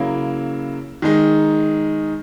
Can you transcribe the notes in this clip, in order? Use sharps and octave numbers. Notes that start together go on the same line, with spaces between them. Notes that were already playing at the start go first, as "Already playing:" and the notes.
Already playing: C#3 F#3 A#3 E4
D#3 G#3 D#4